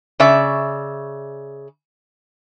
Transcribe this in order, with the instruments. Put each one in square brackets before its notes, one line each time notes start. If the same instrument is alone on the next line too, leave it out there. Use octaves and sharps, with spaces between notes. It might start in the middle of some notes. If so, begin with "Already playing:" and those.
[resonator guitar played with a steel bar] C#3 D5 E5